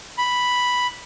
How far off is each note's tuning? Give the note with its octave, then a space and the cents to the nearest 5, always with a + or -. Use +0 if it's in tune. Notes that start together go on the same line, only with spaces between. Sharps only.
B5 +0